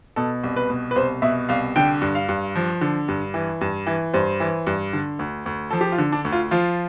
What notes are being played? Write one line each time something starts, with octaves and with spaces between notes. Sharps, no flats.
B2 A4
C2
B4
B2
B4
C2 C5
B2 E5
C2 F5
D3 G5
G2
F5
G2
F3
D3
G2
E3
G2
E3
G2 C5
E3
G2
D3
D2
D2
F3 A4
G4
F4
D3
D4
D2
F4
F3 F4